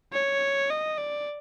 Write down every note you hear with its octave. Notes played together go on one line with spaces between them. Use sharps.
C#5
D#5
D5